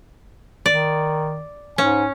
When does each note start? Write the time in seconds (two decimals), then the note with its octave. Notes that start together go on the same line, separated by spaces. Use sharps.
0.66 D#3 D5
1.78 G#2 C#4 G#5